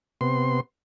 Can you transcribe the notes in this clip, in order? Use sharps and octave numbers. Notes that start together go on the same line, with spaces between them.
C3 B3 C6